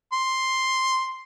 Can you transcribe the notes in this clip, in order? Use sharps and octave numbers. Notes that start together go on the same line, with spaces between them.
C6